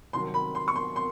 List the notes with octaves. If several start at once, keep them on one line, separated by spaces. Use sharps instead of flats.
C2 C3 D#3 F#3 C6
B5
C6
C#6
C6
C6